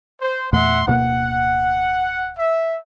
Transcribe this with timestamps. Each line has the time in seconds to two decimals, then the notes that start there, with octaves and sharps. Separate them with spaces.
0.21 C5
0.53 E2 A#2 A3 E5 F#5 C6
0.87 D1 B2 A#3 F#5
2.38 E5